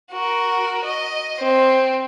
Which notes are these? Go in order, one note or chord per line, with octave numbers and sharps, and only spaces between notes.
F#4 A#4
D#5
C4